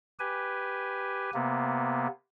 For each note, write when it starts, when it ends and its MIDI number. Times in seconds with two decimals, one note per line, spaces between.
0.20 1.30 67
0.20 1.30 71
0.20 1.30 80
1.34 2.07 48
1.34 2.07 58
1.34 2.07 59